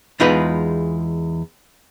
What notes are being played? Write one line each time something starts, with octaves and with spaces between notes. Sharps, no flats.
E2 G#3 D#4 F4 G#4 B4